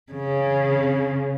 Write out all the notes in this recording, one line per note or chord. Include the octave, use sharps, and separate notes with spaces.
C#3